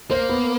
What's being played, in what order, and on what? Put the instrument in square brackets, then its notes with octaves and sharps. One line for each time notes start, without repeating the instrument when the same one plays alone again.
[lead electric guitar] A#3 [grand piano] C5
[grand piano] B3